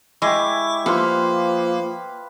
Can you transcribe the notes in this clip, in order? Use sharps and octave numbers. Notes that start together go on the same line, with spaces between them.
G#3 E4 G4 C#6 D6
F3 A#3 G4 A4 B4 F5 C6